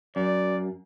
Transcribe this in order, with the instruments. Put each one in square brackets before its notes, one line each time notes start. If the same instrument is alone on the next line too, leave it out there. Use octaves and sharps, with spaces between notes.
[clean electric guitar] F#2 [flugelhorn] D5